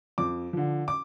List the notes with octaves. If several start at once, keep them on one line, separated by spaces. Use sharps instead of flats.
F2 D6
D3 F3
D6